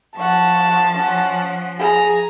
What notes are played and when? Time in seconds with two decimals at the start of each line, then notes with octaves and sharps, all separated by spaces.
0.17 F3 F#5 A5 C#6
0.94 C#4 F#5
1.79 G#4 A#5